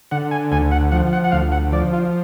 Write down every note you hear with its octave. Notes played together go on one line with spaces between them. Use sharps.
D3 F#5
G#5
D2 G#5
F#5
F3 F#5
F#5
F#5
D2 F5
F#5
F3 D5
F4